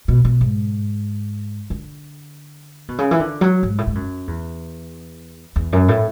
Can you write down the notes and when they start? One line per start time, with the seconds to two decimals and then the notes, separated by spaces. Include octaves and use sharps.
0.08 B2
0.25 B2
0.41 G#2
1.70 D3
2.88 B2
2.99 C#3
3.11 E3
3.20 D3
3.41 F#3
3.63 G#2
3.78 A2
3.87 G#2
3.95 F#2
4.28 E2
5.56 E2
5.73 F#2
5.89 A2